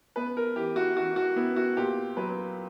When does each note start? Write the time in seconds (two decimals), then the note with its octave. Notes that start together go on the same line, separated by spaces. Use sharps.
0.16 B3 B4
0.37 A#4
0.56 E3 G4
0.76 F#4
0.96 E3 F#4
1.16 F#4
1.36 B3 E4
1.56 F#4
1.77 A#2 G4
2.17 F#3 B4